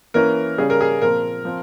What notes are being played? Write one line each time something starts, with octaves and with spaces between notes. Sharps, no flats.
E3 A#3 C#4 A#4
C#3 G3 C#4 G#4
A#4
G#4
A#2 F3 C4 A#4
F3 C4